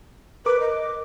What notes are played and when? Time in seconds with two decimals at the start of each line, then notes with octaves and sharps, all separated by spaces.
0.46 A#4 B4 D6
0.60 D#5